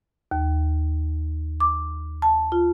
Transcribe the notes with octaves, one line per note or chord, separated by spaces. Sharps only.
D#2
D6
A5
F4